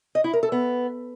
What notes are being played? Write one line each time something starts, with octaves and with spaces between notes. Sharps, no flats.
D#5
E4
A#4
A4
B3